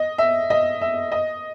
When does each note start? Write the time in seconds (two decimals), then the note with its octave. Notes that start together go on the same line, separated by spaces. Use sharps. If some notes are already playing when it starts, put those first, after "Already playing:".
Already playing: D#5
0.18 E5
0.50 D#5
0.81 E5
1.12 D#5